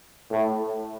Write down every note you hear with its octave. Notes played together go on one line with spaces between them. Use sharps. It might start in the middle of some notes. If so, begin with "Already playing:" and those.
A2